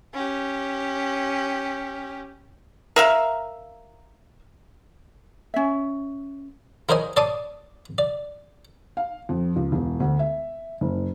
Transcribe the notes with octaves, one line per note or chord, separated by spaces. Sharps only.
C#4 G4
A#4 E5 F5
C#4 E5
E4 A#4 C5 C#5 D#5 G#5
C#5 D5 A5 C6 D6 D#6
D5
F5
F2
C#2
E1
D2
E5
F#1